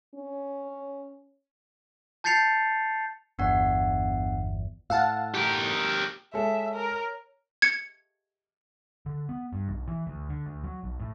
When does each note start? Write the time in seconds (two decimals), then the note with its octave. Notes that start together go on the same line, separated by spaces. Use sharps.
0.15 C#4
2.24 A5 G6 A6 C7 C#7 F7
3.39 G1 E2 B3 D4 F#5
4.90 A2 F5 F#5 A5 E6
5.35 G4 A#4
6.34 G#3 A4 C#5 E5
6.74 A#4
7.62 G#6 C#7
9.06 D3
9.29 B3
9.53 G2
9.69 B1
9.88 E3
10.07 D2
10.29 D3
10.46 D2
10.64 F#3
10.84 B1
11.00 A2